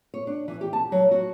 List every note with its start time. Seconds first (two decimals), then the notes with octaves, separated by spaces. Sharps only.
0.14 C#5
0.27 D4
0.48 E3
0.61 G4
0.73 A5
0.92 F#3
1.11 F#4